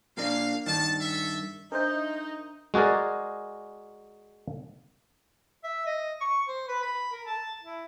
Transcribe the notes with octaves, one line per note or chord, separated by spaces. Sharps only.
A#2 A#3 D4 F5
G2 D#3 A5
A4 E5
D4 D#4 A#4 C5 E5 G6
G#3 F#4 G#4 A#4 D5
E5
D#5
C#6
C5
B4
B5
A#4
A5
E4